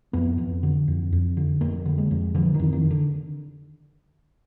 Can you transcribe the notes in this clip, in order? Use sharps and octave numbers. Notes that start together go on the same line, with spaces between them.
F2 B3
F2
D3
F2
F2
D3
F2 A#3
D3
G#3
F2
D3 F3
D#3
F2
D#3
D3